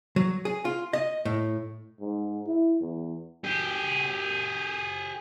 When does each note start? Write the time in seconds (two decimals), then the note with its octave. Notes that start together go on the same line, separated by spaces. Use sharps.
0.16 F#3
0.45 G#4
0.65 F4
0.93 D#5
1.25 A2
2.01 G#2
2.47 E4
2.81 E2
3.44 G4 G#4